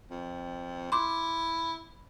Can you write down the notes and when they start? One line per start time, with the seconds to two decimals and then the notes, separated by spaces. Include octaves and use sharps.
0.10 F2
0.92 E4 C6 D6